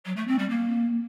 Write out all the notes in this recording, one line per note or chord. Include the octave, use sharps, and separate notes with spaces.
F#3
A3
C4
G3
A#3